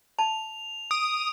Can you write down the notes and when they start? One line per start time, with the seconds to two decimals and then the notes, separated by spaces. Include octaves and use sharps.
0.19 A5 F7
0.91 D#6 D7